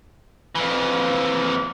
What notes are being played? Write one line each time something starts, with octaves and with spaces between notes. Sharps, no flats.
F2 E3